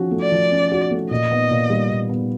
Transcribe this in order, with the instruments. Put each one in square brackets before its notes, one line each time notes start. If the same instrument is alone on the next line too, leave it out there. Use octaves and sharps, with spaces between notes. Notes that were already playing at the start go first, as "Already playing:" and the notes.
Already playing: [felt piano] F3 C#4 F#4
A3
[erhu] D5
[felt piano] F3
C#4
F#4
A3
[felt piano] A#2 [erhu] D#5
[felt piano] B3
A#2
G3
A#2
B3